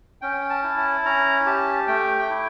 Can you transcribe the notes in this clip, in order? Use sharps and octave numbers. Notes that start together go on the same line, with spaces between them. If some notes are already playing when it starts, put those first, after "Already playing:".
C#4 G5
A5
E4
A5
C#4 A#5
G4 A5
A3 G5
E4